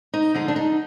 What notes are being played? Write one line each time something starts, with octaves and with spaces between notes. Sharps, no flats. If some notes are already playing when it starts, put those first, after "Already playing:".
D#4
D3 F3 G#3 D#4
D4
D#4